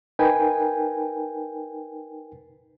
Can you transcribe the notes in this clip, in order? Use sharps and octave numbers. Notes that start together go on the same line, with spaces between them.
D#4 A#4 B4 G5 G#5